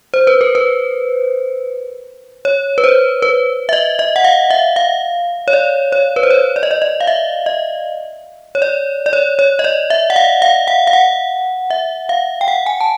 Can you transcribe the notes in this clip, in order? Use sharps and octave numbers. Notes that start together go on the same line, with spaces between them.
C5
B4
A#4
B4
C#5
B4
C5
B4
E5
D#5
D#5
F#5
F5
E5
F5
C#5
D5
C#5
B4
C5
C#5
D5
D#5
D5
D#5
F5
E5
D#5
C#5
D5
D5
C#5
C#5
D#5
D5
E5
F#5
F5
F5
F#5
F5
F#5
E5
F5
G5
F#5
G#5
A5